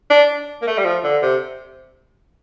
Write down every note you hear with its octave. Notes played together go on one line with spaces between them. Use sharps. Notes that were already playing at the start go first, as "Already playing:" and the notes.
D4
A#3
A3
G3
F3
D3
C3